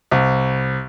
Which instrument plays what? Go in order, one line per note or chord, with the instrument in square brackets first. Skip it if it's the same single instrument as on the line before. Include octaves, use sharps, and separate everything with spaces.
[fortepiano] C2